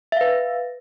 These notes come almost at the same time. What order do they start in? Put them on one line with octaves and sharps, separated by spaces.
E5 F5 B4